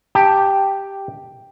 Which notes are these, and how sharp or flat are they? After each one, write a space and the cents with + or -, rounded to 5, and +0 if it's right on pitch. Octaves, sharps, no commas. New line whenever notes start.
G4 +0 A5 +0